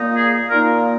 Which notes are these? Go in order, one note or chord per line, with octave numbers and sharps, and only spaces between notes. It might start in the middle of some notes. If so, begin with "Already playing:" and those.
Already playing: A#2 A#3 D#4
G#4
A#2 A#3 D#4 A#4